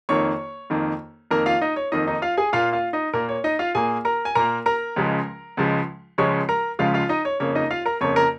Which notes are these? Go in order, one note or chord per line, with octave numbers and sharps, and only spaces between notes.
F2 D#3 A#3 C#5 C#6
F2 D#3 A#3
F2 D#3 A#3 A#4 A#5
F4 F5
D#4 D#5
C#5
F2 D#3 A#3 D#4 D#5
D#4 D#5
F4 F5
G#4 G#5
A#2 A#3 F4 F5
F4 F5
D#4 D#5
A#2 A#3 A#4
C#5
D#4 D#5
F4 F5
A#2 A#3 G#4 G#5
A#4 A#5
G#5
A#2 A#3 A#4 A#5
A#4 A#5
C#2 C#3 F3 G#3
C#2 C#3 F3 G#3
C#2 C#3 F3 G#3 C#5 C#6
A#4 A#5
C#2 C#3 F3 G#3 F4 F5
F4 F5
D#4 D#5
C#5
F2 C#3 A#3 C#5
D#4 D#5
F4 F5
A#4 A#5
F2 C#3 A#3 C#5 C#6
A#4 A#5